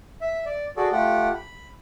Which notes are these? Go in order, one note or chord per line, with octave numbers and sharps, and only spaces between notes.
E5
D5
F#4 G#4 A4 D5
A3 F4 G4 F#5 G5
B5